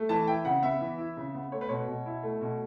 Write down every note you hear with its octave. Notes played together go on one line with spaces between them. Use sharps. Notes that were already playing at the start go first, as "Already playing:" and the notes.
Already playing: A3
E3 A5
E4 G5
C#3 F#5
B3 E5
E3
E4
C#3
B3
A3 C#5
B4
B2 C#5
B2
E4
A3
B2